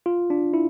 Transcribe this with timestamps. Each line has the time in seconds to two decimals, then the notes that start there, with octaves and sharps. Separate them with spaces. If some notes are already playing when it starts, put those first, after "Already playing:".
0.06 F4
0.30 D4
0.54 E4